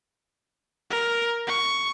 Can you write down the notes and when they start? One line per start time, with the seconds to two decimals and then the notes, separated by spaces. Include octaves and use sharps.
0.90 A#4
1.47 C#6